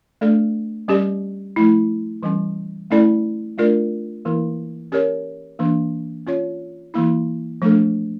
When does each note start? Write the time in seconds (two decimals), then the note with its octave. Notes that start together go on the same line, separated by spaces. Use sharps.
0.21 A3 D4 A4 D5
0.88 G3 C#4 G4 D5
1.56 F3 A3 E4
2.23 E3 G3 C#4
2.91 A3 C#4 E4 A4 D5
3.58 A3 D4 F4 A#4 D5
4.25 E3 A#3 E4 A#4
4.92 C#4 G4 A#4 C#5
5.59 E3 A#3 D4
6.27 C#4 F4 C#5
6.94 E3 A#3 E4
7.62 F3 A3 D4 A4